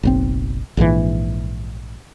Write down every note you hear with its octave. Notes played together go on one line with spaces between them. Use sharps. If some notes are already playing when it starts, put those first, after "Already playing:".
F#1 B1 C4
A#1 G#2 B2 E3